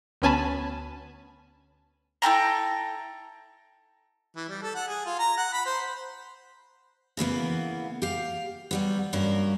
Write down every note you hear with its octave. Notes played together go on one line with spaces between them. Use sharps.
D2 B3 C#4 G#5 A5 B5
E4 A4 G5 A#5
E3
G3
A4
F#5
G#4
F4
A#5
F#5
B5
C5
C#3 E3 A#3 B3
G4 F5
F#3 G3 B3
G2 F#3 A#3 C#4 A#4